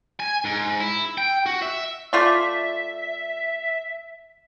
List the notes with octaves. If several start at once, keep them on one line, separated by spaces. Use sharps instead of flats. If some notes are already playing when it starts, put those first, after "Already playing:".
G#5
G#2
E4
G5
F#4
E5
A3 F4 D5 E5